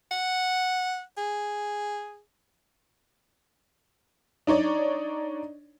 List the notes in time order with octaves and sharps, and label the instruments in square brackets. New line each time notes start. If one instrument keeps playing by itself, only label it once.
[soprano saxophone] F#5
G#4
[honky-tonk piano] D4 D#4 C#5 D5